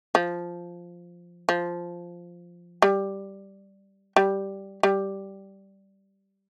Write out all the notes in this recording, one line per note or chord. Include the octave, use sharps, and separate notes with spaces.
F3
F3
G3
G3
G3